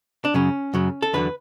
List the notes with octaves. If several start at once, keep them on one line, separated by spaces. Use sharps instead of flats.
D4
F#2 C#3 F#3 C#4
F#2 C#3 F#3
A4
E2 D3 F#3 B4